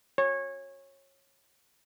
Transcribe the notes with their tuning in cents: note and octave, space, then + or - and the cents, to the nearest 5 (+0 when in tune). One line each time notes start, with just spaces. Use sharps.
C#5 -20